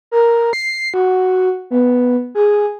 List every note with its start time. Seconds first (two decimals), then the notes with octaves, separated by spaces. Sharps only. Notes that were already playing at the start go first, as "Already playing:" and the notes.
0.11 A#4
0.53 C7
0.94 F#4
1.71 B3
2.35 G#4